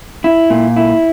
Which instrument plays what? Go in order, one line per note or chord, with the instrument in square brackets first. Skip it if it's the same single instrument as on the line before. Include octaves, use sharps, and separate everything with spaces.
[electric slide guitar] E4
A#2
E4